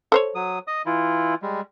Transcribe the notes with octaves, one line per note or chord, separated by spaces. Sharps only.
A4 C5 C#5
F#3 D#6
D#5 D#6
E3 E4 F4
G3 G#3